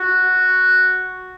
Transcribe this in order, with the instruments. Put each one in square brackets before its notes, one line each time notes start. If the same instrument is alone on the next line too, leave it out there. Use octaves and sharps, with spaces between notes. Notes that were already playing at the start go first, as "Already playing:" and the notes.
Already playing: [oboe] F#4